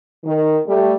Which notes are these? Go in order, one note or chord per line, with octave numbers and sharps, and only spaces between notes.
D#3
G3 A3